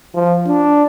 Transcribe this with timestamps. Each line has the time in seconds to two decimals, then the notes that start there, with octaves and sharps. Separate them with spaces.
0.15 F3
0.47 D4